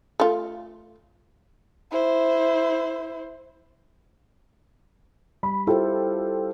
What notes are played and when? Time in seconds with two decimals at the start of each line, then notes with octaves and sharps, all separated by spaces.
0.20 A3 F4
1.91 E4 C5
5.43 G3 B5
5.67 E4 F4 G4 A4 C5 G5